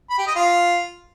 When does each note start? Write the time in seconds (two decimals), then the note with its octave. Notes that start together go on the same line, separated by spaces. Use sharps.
0.10 B5
0.19 G4
0.27 D#5
0.35 F4